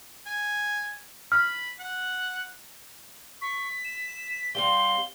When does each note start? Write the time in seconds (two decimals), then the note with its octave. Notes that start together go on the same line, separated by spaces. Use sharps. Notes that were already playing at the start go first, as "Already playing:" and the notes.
0.26 G#5
1.32 B5 F6
1.79 F#5
3.41 C#6 B6
3.85 E7
4.55 G3 B3 C4 F5 G7